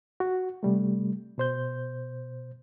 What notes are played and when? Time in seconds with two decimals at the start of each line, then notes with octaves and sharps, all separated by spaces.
0.20 F#4
0.63 C3 G3 A3
1.38 B2 C5 G6